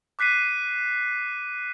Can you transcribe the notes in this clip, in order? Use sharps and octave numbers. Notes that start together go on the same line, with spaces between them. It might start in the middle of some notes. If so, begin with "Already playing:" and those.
D6 F#6 B6 C7 D#7